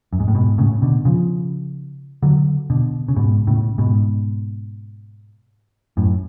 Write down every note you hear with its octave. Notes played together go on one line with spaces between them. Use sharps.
F#2
G#2
A2
G#2 B2
A2 C#3
B2 D3
C#3 F3
D3 F#3
B2 D3
C#3
G#2 B2
A2 C#3
G#2 B2
F#2 A2